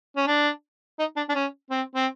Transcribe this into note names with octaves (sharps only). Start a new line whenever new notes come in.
C#4
D4
D#4
D4
D4
C#4
C4
C4